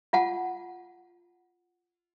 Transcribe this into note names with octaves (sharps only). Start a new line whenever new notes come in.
F4 F#5 A5